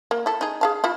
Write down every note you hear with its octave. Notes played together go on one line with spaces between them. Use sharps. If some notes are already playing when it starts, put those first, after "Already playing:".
A#3
E4 A4
D#4 G#4
G#4 F5 A5
E4 F4